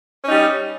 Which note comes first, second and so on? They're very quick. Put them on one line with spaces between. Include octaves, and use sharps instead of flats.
C#4 D#4 G3